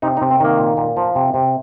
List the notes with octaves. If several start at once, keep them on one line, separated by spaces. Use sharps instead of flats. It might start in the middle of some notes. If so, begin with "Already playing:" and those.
C3 D#4
D#4
C3
C4
D#3 A#3
A#2
A#2
F3
C3
C3